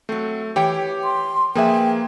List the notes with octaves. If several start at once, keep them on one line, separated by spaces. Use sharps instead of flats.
F#3 A3 C4
E3 G4 C#5 G5
C6
F3 A#3 G#4 B4 E5 G5